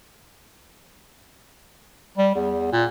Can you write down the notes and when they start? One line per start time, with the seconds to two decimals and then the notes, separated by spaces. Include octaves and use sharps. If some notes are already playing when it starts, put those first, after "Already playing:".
2.18 G3
2.35 E2
2.72 A#2